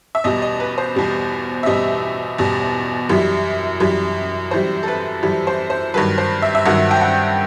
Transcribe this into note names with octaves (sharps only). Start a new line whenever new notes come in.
E5
E2 B2 G3 D#5
D#5
B4
C5
E2 B2 G3
E5
E2 B2 G3 D#5
E2 B2 G3
F#2 E3 G3
F#2 E3 G3
F#2 E3 G3 C5
A4
B4
F#2 E3 G3
C5
C5
G2 D#3 F#3 B4
C5
E5
E5
G2 D#3 F#3 F#5
G5
F#5